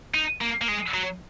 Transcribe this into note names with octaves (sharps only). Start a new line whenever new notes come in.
D#4
A#3
A#3
G#3
F#3